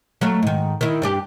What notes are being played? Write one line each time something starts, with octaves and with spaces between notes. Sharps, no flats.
F#3 A3 F5
G#2 D#3
D#3 E4
G2 D4 G4